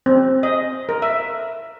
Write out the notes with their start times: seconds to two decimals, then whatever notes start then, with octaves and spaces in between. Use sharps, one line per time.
0.06 C4
0.43 D#5
0.89 A#4
1.02 E5